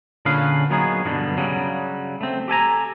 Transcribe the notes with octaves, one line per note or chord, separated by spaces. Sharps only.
A#2 D3 C#4 G#4 B4 F5
F#3 A#3 B3 C#4 D#4 G#4
G2 B2 D3 E3 F3
C#3 F#3 G3
A3 C4
G4 A4 G#5 A#5